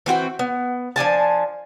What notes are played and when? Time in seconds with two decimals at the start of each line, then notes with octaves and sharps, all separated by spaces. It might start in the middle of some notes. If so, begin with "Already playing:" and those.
0.06 E3 C4 F#4 G5
0.39 B3
0.96 F3 D4 G#5 A5